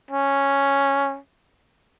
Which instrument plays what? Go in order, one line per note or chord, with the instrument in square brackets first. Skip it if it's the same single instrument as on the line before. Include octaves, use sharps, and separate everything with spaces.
[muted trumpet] C#4